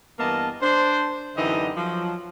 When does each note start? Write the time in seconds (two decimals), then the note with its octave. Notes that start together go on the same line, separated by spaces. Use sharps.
0.19 G2 E3 A#3 B3 D#5 A5
0.62 D4 C5
1.37 F#2 D3 E3 D#4 G4 D#5
1.76 F3 F#3